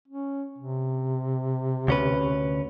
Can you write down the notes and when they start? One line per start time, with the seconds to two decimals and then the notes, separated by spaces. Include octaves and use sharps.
0.08 C#4
0.58 C3
1.88 D2 C#4 B4